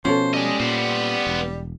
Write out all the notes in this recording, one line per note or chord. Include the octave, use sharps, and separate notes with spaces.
B2 F3 C#4 A4 C5
G3 G#3 D#5
A#2 B3 C5
E1